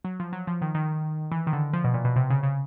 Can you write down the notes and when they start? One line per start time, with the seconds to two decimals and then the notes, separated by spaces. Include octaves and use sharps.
0.04 F#3
0.20 F3
0.33 F#3
0.47 F3
0.62 D#3
0.75 D#3
1.32 E3
1.47 D#3
1.53 D3
1.73 F3
1.84 B2
1.94 A#2
2.04 B2
2.16 C3
2.30 C#3
2.43 C#3